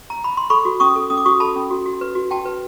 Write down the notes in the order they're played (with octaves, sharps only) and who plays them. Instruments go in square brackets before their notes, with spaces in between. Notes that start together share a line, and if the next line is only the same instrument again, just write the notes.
[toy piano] A#5
B5
C6
A4 B5 C#6
F#4
C#4 C#6 D#6
A4
C#4 D#6
D6
F#4 C#6 D#6
A4 A5 B5
C#4
F#4
F#4
B4
F#4
F#4 G5 A5
B4